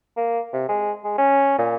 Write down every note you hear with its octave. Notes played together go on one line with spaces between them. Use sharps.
A#3
C3
G#3
G#3
C#4
A#2